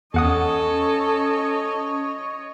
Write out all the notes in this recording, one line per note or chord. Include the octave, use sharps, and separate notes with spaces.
E2 C#4 A4 C#5 D#5 F#5 D#6